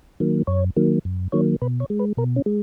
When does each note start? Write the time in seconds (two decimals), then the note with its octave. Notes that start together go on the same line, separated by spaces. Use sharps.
0.20 D#3 F#3 A#3
0.47 F#2 C#5
0.77 D#3 F#3 A#3
1.05 F#2
1.32 D#3 F#3 A#3 C#5
1.62 B2 B4
1.80 C#5
1.90 G#3
1.99 B4
2.17 B2 A#4
2.36 C#4
2.46 G#3